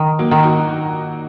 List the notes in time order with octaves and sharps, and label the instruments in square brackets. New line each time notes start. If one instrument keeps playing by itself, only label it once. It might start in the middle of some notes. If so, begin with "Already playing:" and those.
Already playing: [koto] D#3
[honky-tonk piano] F#3 A#3
[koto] D#3
[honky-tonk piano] D#4 F#4